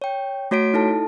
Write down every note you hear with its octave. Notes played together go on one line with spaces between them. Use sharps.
C#5 G5
A3 F#4 C#5 B6 D7
D#4 E4 A4 A5